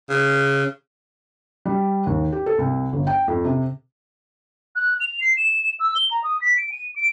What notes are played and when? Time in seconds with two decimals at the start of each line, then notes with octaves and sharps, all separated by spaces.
0.09 C#3
1.66 G3
2.07 D#2
2.32 G4
2.46 A4
2.58 C2
2.93 G1
3.07 G5
3.28 F2
3.45 C3
4.76 F#6
5.00 F7
5.21 C7
5.37 E7
5.80 E6
5.95 G7
6.11 A#5
6.23 D#6
6.41 B6
6.57 D7
6.71 D#7
6.96 D7